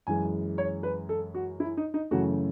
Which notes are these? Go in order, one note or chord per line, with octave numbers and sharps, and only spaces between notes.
F#2 E3 G#3 G#5
C#5
B4
A4
F#4
E4
D#4
D#4
F#2 C#3 E3 A3 F#4